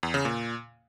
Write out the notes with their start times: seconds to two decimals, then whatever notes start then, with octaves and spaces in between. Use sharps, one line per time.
0.03 E2
0.14 C#3
0.25 A#2